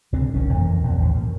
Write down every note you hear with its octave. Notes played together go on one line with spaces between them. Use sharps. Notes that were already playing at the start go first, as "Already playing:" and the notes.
C2 B2 D3 C4
F#1 D#3 C#4
F2 E3 A#3
A#1 F2 B2
A1 D#2
F#2